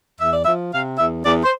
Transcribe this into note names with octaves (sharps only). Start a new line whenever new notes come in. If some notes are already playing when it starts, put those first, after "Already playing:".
E2 E5
D5
F3 E5
C3 F5
E2 E5
E2 D5
C5